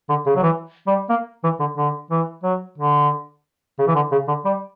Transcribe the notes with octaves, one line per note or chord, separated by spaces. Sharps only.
D3
C#3
F#3
E3
G3
A#3
E3
D3
D3
E3
F#3
D3
C#3
E3
D3
C#3
D3
G3